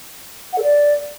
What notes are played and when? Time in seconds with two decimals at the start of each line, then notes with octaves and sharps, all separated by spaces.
0.53 F#5
0.58 A4
0.63 D5